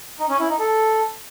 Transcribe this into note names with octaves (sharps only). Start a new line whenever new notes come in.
D#4
C#4
E4
D#4
A4